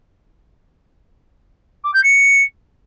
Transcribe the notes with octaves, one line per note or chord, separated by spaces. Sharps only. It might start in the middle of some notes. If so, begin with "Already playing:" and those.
D6
G6
C#7